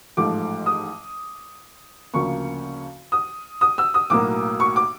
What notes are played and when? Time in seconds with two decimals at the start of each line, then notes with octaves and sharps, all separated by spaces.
0.17 A1 G#2 F3 A3 D6
0.66 D#6
2.13 D2 C#3 F3 A#3 C#6
3.12 D#6
3.61 D#6
3.78 E6
3.94 D#6
4.10 B1 A2 F#3 A#3 D6
4.60 C#6
4.76 D6